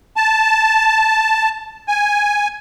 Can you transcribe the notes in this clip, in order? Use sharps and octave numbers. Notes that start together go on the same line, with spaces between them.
A5
G#5